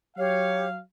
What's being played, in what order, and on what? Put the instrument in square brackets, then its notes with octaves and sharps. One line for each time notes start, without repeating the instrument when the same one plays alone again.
[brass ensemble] F#3 F5 [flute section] G4 C#5